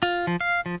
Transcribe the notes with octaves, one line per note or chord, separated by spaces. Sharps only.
F4
F3
F5
F3